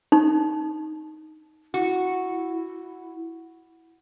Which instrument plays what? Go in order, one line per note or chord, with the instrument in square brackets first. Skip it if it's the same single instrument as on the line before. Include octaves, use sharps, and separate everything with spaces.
[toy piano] D#4
[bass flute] E4 [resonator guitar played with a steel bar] F#4